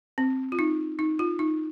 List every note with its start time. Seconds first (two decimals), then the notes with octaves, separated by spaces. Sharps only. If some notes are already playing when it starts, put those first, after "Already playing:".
0.18 C4
0.52 F4
0.59 D#4
0.99 D#4
1.19 F4
1.39 D#4